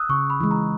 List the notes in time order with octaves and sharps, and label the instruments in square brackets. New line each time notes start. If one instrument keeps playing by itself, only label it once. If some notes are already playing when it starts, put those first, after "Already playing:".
Already playing: [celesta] D#6 E6 F#6
[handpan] C#3 [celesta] C#6
[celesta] B5
[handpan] E3 G#3
[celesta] A#5